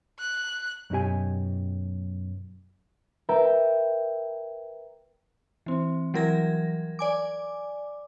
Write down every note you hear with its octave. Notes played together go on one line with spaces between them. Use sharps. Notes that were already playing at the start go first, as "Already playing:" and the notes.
F#6
F#2 B2 D#4 G4 G#5
A#4 B4 E5 G5 A#5
E3 C4
E3 F#3 G3 A#4 G#6 A#6
D5 G#5 D6